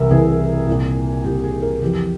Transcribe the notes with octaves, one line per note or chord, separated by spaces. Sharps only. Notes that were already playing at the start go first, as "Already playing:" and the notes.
Already playing: C2 C3 E3 A#4 E5
C2 C3 E3 G#4
C2 A#2
C2 A#2 G4
G#4
A#4
F2 E3 G4